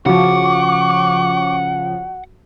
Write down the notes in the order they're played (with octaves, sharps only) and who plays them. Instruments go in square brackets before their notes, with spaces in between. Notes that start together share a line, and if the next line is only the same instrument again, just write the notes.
[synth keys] C#3 F3 [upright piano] F#4 [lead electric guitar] F#5 [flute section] C#6 D6